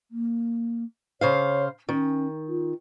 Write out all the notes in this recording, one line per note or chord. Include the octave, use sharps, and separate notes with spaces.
A#3
C#3 C5 C#5 F5
D#3 C#4
F4